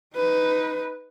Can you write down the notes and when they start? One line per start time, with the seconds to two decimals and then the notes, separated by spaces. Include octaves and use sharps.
0.15 D#4 B4